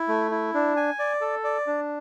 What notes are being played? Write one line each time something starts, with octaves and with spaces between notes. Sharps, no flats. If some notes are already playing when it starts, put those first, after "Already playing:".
Already playing: E4
A3
E4
D4
G#5
D5
A4
D5
D4